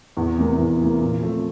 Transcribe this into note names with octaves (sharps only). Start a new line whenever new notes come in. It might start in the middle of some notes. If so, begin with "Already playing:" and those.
E2
C3 E3 A#3
E2
C3 E3 A#3
A#2
F3 A3 C4